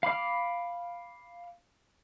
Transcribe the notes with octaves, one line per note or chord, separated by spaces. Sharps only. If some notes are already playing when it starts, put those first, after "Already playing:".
F5 B5 D6 F6